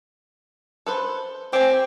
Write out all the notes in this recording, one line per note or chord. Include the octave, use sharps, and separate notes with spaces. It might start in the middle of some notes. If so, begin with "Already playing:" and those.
A4 B4 C5
C4 G4 G#5